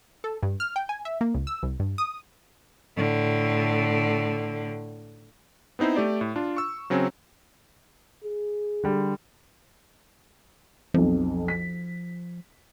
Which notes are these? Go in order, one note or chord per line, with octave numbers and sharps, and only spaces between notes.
A4
G2
F6
G5
G#5
E5
A#3
C#2
E6
C2
G2
D#6
A2 D3
B3 C4 D#4 E4 C5
A3 G4 D5
A2
D4 F4
C#6 E6
C#3 F#3 C4 C#4
G#4
D3 G3
B1 F2 F3
B6